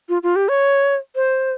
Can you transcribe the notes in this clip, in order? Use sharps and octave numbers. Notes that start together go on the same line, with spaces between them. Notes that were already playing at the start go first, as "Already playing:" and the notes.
F4
F4
G4
C#5
C5